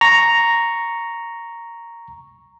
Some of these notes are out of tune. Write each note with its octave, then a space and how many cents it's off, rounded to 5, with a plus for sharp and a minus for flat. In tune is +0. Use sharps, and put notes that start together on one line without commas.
A#5 +0 C#6 +0